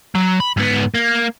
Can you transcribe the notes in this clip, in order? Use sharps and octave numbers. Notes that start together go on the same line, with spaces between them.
F#3
B5
G#2 B3
A#3